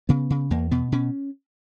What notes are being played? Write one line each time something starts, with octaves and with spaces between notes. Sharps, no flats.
C#3 B3
C#3
E2 A#3
B2 B3
B2 C#4